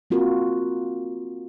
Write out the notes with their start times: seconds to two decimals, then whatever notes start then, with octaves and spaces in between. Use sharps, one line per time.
0.11 A#3 C4 F4 F#4 A#4